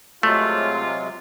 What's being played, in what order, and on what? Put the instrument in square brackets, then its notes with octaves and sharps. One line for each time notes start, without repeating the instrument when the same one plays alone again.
[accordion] C3 F#3 G#3 [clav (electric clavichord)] A3 [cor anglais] F4